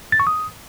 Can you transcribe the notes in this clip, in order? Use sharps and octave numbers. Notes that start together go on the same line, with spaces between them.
A6
C#6
D#6